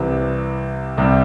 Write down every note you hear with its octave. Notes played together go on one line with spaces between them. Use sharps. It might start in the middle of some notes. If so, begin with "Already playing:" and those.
Already playing: C2 C3 E3
C2 C3 G3